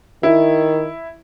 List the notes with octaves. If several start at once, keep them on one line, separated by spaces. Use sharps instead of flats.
D#3 E4